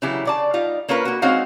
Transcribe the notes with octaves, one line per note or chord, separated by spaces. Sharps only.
C#3 E3 F#3 E4 G4
C#3 D5 A5
G3 D#4 F4
A#3 C#4 F4 A#4 B4
A#3 F#4
G#3 C4 C#4 D#4 F#4 F5